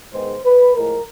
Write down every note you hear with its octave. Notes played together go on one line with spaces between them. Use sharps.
G#2 D#3 G#3 B3 C5
B4
A2 F3 G#3 A#4